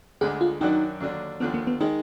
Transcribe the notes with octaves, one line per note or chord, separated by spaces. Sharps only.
D2 D3 G#3 G#4
F4
F#2 D#3 F#3 D4 D#4 F#4
D#2 D3 F#3 D4
D#2 D3 F3 B3
A#3
B3
D#3 G#3 D#4